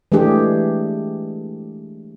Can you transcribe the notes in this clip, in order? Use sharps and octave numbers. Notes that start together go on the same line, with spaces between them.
E3 G#3 A3 D4 G4 G#4